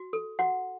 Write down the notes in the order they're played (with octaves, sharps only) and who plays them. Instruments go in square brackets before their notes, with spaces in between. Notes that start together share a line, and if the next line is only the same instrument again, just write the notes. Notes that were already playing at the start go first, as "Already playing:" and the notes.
Already playing: [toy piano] F#4
A4
F#4 F#5